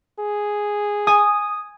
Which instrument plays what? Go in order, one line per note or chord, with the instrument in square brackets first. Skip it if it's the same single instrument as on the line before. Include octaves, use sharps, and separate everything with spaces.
[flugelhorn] G#4
[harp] G#5 [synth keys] D#6